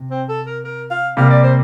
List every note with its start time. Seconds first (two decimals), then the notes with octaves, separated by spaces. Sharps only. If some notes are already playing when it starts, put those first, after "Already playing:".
Already playing: C3
0.10 C4
0.28 A4
0.46 A#4
0.64 A#4
0.90 F5
1.17 C3 G3 A#3 F5
1.30 D5
1.44 C5